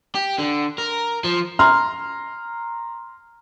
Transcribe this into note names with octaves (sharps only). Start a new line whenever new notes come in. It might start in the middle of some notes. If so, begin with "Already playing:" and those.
G4
D3
A#4
F3
A#5 C6 F6